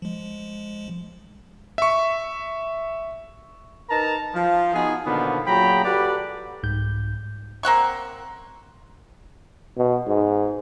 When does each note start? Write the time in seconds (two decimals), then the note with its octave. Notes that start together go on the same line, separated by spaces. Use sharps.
0.02 F3 G#3
1.78 E5 C#6
3.90 D#4 A#4 B4 A5 A#5
4.34 F3
4.74 B3 D#4 F#4 G#4
5.05 B2 D3 D#3 F3 A#3 B3
5.47 A#2 F#3 G#4 G5 A#5 B5
5.84 F#4 G4 A4 B4 D5
6.63 C2 G#2 G6
7.63 A#3 C4 F#5 C#6
9.77 B2
10.07 G#2